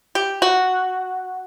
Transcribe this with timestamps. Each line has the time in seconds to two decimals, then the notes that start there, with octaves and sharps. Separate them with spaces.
0.15 G4
0.42 F#4